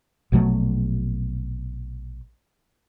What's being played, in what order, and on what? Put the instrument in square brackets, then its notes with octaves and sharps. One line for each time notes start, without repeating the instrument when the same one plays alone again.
[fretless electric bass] A#1 B2 F#3 A3